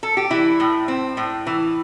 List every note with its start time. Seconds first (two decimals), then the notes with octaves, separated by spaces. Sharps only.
0.03 A4
0.17 G4
0.30 E3 E4
0.60 A2
0.88 C4
1.17 A2
1.47 E3